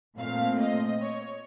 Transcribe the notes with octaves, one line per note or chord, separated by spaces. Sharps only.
A#2 A3 C4 F5
D#5
C#5